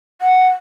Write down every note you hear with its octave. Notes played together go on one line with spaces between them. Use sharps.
F#5